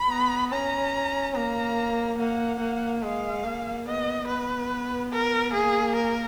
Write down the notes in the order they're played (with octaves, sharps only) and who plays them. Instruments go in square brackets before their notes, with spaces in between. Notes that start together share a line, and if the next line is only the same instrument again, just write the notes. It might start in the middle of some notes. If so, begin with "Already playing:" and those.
Already playing: [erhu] B5
[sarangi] B3
[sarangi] C#4 [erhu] A#5
[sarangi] A#3 [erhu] A#5
[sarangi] A#3 [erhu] F#5
[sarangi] A#3
[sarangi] G#3 [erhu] F5
[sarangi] A#3
[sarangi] B3 [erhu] D#5
[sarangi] B3 [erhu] B4
[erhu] A#4
[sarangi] A#3 [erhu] G#4
[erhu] A#4